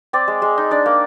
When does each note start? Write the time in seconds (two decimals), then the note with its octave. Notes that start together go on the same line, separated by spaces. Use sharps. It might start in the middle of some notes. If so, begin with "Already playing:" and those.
0.13 C4 D5
0.28 G#3
0.42 G#3
0.58 D#4
0.71 D4 D5
0.86 A#3